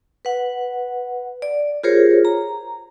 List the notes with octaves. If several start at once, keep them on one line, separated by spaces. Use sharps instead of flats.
B4 F#5
D5
F4 G4 G#4 A#4 C5 C#5
A#5